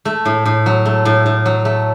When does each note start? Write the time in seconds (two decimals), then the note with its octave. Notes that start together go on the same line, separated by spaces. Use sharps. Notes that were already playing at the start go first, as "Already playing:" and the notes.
0.05 A3
0.25 A2
0.46 A2
0.66 F#3
0.85 A3
1.05 A2
1.26 A2
1.46 F#3
1.65 A3